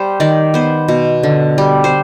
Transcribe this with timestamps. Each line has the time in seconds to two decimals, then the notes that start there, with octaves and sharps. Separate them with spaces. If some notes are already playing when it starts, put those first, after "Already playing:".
Already playing: G3 C5
0.20 D#3 D5
0.54 B3 C5
0.88 B2
1.23 D3
1.58 G3
1.84 C5